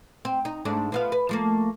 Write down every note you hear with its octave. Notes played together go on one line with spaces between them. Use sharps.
C4
D#4
G#2 A3 D4
F3 B3 F5
B4
F3 A3 A#3